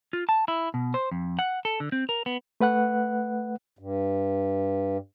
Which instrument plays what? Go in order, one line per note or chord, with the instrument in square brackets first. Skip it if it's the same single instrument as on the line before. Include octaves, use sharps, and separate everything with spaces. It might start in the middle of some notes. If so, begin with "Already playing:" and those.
[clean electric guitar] F4
A5
E4
B2
C5
F2
F#5
A4
D3
C4
A#4
B3
[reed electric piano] A3 B4 F#5 F#6
[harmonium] G2